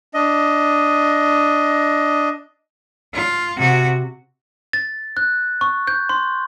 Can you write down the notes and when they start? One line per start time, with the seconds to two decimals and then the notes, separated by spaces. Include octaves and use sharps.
0.14 D4 D#5
3.14 F4
3.57 C3 F#4
4.73 A6
5.17 F#6
5.61 C#6
5.87 G6
6.09 C6